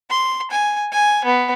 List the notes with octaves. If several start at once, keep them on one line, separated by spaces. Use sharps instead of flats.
C6
G#5
G#5
B3